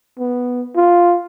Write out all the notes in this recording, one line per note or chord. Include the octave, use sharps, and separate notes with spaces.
B3
F4